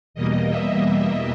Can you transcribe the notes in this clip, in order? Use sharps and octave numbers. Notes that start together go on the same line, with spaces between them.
E2 B2 G3 A#3 D#5
E5
D#5